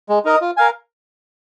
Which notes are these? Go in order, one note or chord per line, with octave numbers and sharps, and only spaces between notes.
G#3
D#4 A#4 D#5
F4
A#4 F5 G#5